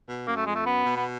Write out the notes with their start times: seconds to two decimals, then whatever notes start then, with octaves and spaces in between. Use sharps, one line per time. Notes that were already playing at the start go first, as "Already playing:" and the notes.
0.08 B2
0.27 F#2 A#3
0.37 A3
0.47 F2 G#3
0.55 A3
0.66 F#2 B3
0.85 B2
0.97 B3